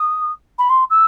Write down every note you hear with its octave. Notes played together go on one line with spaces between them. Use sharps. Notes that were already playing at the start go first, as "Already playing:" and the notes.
Already playing: D#6
B5
C6
E6